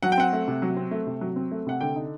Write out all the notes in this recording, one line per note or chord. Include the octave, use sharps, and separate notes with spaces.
F#3 F#5
G5
C4 F#5
A3
C3
F#3
C4
A3
C3
F#3
C4
A3
C3 F#5
D3 G5
D#4